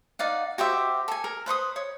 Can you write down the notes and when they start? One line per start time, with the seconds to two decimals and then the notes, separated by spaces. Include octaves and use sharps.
0.19 D#4 D5 F5 F#5
0.58 F#4 G4 C5 E5
1.08 A4 G#5
1.24 A#4
1.46 B4 C5 C#6 D#6
1.76 C#5